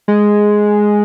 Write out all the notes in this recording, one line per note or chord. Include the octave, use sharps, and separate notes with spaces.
G#3